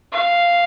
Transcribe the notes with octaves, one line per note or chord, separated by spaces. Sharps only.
F5